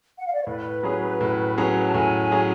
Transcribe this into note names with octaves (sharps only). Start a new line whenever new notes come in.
F#5
F5
D5
C#5
A2 B4
F#3 C#4 G#4
A2
F#3 C#4 G#4
A5
A2 G#5
F#3 C#4 G#4